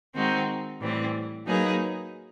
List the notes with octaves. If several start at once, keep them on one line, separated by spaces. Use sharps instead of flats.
D#3 G#3 C4 D#4 F#4
A2 E3 G3 C4
F#3 A#3 D#4 G#4 B4